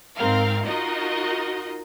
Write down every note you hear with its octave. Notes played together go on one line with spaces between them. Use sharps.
G#2 C4 A#4 F5
D#4 F4 F#4 A#4 D#5